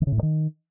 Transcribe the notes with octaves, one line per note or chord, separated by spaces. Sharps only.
D#3
C#3
A2
G2
D#3